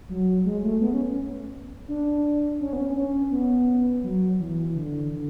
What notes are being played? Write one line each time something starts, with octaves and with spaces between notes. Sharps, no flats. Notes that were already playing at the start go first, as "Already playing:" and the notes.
F#3
G#3
A3
B3
C#4
D4
C#4
B3
C#4
C#4
B3
F#3
E3
D3
D3